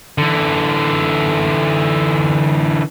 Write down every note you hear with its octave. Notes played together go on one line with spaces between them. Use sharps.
D3 E3